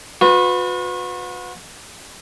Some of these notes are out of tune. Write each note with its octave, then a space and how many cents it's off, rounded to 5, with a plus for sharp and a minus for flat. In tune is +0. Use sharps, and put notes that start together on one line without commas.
F#4 -40 B4 +20